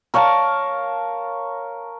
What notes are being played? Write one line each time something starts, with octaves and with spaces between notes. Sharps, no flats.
A#4 C#5 F5 A5